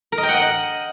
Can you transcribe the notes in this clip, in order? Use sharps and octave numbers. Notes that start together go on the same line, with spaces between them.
A#4
D#5
G5
F#5
D#5